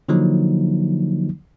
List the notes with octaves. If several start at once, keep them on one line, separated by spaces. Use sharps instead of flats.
D3 F3 F#3 A#3 D#4